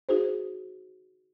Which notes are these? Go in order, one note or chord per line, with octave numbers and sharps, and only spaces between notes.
D#4 F#4 G#4 C5